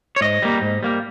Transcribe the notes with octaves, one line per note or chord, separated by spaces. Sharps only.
C#5
G#2 D#5
G3 A#3
G#2
G3 A#3